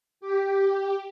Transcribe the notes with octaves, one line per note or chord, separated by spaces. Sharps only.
G4